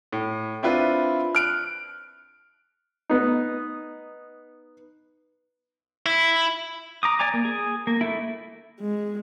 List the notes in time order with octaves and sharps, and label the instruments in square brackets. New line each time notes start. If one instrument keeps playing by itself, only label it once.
[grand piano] A2
C4 D4 E4 F4 B4
F6 F#6 D7
[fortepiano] B3 D#4
[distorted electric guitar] E4
[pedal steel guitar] A#5 D6 D#6
D5 G#5 A#5 D6
A#3
G#4
A#3
A3 E4
[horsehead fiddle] G#3